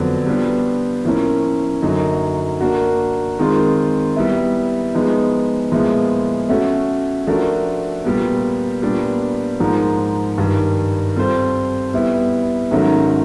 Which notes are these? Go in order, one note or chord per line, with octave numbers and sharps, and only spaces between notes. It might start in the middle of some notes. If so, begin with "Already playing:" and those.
Already playing: F2 D3 F#3 B3 D4
G3 B3 D4 F4
A2 F3 A#3 C#4
F#2 D3 F#3 A#3 D#4
A#3 D4 F#4
D#3 G#3 C4 F4
G3 B3 E4
F3 G#3 B3 D#4
A#2 F3 G#3 B3 E4
A3 C#4 F#4
F3 A3 D4 F#4 A#4
A#2 G3 B3
A#2 G3 B3 D4
G#2 F3 A#3
G2 D#3 G3
G3 C4 F4 A4 C5
G3 B3 E4
G#2 D#3 F#3 A3 C#4